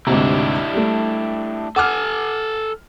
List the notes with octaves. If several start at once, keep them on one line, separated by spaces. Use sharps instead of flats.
D2 G#2 C3 D4 E4 G4
G3 A3
A4 F#5 G#5 D6 F6